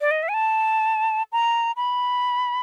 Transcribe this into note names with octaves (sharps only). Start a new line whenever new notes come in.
D5
D#5
E5
G#5
A5
A#5
B5